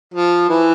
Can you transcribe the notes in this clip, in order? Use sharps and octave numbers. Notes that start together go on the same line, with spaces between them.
F3
E3